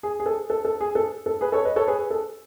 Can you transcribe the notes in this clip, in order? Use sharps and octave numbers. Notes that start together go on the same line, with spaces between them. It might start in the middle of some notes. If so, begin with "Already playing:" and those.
G#4
G#4
A4
A4
A4
G#4
A4
A4
G#4 B4
A4 C#5
B4 D#5
A4 C#5
G#4 B4
A4